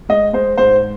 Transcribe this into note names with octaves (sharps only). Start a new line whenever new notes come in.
G#3 D#5
G#3 C5
G#2 C5